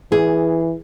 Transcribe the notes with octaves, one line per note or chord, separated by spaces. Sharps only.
E3 G#4